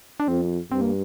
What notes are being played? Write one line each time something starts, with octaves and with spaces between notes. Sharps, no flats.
D4
F2 C4
G2 C4
A#3